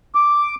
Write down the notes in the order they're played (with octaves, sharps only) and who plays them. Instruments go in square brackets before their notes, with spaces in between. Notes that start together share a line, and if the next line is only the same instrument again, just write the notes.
[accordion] D6